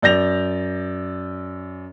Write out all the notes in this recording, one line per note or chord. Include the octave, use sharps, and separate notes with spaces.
F#2 D5 G6 A#6 F7